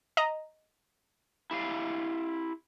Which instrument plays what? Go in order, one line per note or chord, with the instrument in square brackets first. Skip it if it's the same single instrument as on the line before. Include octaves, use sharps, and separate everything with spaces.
[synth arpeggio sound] D#5 A#5
[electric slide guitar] E4 G4 F5